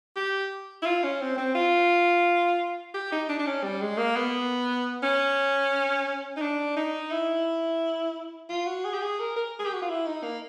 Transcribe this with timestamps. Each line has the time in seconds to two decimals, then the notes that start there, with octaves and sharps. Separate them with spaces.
0.16 G4
0.82 E4
0.86 F4
1.04 C#4
1.21 C4
1.38 C4
1.55 F4
2.94 G4
3.12 D#4
3.29 D4
3.39 D4
3.47 C#4
3.64 G3
3.81 G#3
3.98 A#3
4.16 B3
5.03 C#4
6.37 D#4
6.42 D4
6.77 D#4
7.12 E4
8.50 F4
8.67 F#4
8.85 G#4
8.94 G4
9.02 G#4
9.20 A#4
9.36 A#4
9.59 G#4
9.66 G4
9.73 F#4
9.82 F4
9.89 E4
10.06 D#4
10.23 A#3